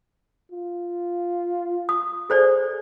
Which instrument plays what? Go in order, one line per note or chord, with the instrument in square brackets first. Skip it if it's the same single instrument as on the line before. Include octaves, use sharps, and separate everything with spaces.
[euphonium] F4
[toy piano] D#6
[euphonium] G#4 [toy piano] A4 C5 D5